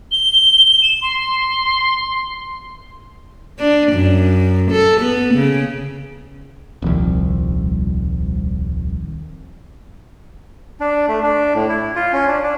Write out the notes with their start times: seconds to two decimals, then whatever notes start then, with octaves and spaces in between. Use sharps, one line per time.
0.12 G7
0.82 E7
1.02 C6
3.59 D4
3.93 F#2
4.71 A4
5.01 B3
5.35 C#3
6.82 D#1 C2 D#3 F3 C4
10.80 D4
11.08 A3
11.23 D4
11.54 A2
11.69 E4
11.96 F4
12.13 C#4
12.28 D4
12.43 D4